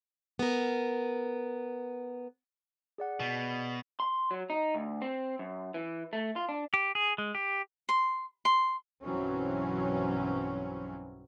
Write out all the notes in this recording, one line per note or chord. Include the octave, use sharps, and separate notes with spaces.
B3 A#4
G#4 D5 F#5
B2
C6
F#3
D#4
D2
C4
F#2
E3
A3
F4
D4
G4
G#4
G#3
G4
C6
C6
B1 G2 E3 F#3 C4 C#4